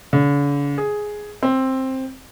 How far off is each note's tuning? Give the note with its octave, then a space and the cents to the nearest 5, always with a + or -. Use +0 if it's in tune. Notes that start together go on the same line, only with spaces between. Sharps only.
D3 -45
G#4 +5
C4 +10